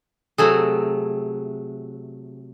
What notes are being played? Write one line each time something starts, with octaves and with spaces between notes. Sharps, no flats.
C3 F#3 A3 G#4